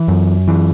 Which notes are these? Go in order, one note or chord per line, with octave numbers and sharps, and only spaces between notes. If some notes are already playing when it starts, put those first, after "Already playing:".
Already playing: E3
F#2
E3